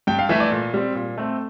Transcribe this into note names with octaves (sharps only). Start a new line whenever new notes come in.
G2 G5
F5
E3 A3 E5
D5
A#2
G3 C4
A#2
A3 C4